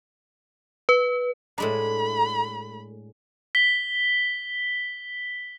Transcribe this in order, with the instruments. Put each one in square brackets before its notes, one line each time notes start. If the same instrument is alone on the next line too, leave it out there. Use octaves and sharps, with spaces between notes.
[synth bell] B4
[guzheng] A2 G#3 D4 [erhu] B5
[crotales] B6 G7